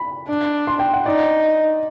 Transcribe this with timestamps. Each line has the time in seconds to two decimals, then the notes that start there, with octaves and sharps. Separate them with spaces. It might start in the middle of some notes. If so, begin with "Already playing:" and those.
Already playing: B5
0.29 D4
0.67 C6
0.79 G5
0.93 F#5
1.06 D#4 D5